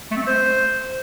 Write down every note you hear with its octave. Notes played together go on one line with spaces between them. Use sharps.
A3
C4
A3
C5